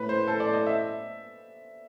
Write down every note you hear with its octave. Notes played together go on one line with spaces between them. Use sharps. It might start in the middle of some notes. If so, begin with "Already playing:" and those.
Already playing: A2 B4
C5
A4
D5
D#5
E5